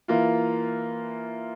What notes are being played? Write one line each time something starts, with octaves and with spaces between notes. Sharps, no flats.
E3 A#3 F4